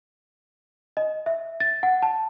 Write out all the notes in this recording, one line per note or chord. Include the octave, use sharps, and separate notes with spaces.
D#5
E5
A6
F#5
A5